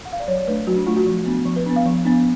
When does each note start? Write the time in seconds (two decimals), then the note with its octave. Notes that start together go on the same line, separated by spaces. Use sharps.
0.05 F#5
0.13 F5
0.20 D5
0.27 F#3 C#5
0.47 A3 D4 B4
0.67 F#3 F#4
0.76 D4
0.87 A3 D4 F4
0.96 F#4
1.06 F3
1.26 B3 D4
1.45 F3
1.56 B4
1.66 B3 D4
1.76 F5
1.85 F3
2.05 B3 D4